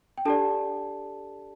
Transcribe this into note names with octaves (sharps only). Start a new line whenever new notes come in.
G5
D4 G4 A4 D5 A5